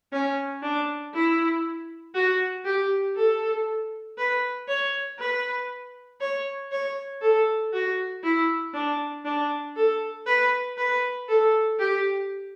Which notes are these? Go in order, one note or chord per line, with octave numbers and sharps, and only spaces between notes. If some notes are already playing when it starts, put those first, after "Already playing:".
C#4
D4
E4
F#4
G4
A4
B4
C#5
B4
C#5
C#5
A4
F#4
E4
D4
D4
A4
B4
B4
A4
G4